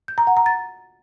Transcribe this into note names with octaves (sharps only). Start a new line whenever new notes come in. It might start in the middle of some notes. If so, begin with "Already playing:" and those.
G6
A#5
F#5
A#5
A6